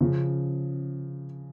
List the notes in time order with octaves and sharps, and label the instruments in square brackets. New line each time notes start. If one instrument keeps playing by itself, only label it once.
[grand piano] C#3 F3